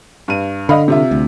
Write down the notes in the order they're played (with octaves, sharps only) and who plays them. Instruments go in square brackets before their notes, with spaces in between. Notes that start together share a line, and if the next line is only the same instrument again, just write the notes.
[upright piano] G2 D#7
[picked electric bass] D3 [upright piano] D#5 F5 B5
[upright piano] C3 F4 E5
[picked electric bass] D2